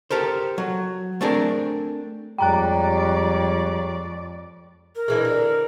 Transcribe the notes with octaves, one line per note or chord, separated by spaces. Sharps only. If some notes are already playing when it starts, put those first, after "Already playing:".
G4 A4 A#4 C5
F#3
A3 C4 D4 G#4 A#4
F2 G3 G#3 C#5 D5 G5 A#5 F#6
A#4
D3 E3 G#3
D3